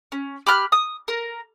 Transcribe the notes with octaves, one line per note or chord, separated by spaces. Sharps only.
C#4
G4 B5 F6 F#6
D#6
A#4